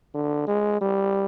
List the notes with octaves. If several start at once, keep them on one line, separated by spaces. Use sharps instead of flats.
D3
G#3
G3